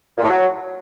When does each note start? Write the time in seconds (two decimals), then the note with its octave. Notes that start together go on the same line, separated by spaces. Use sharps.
0.18 A#2
0.23 A2
0.29 F#3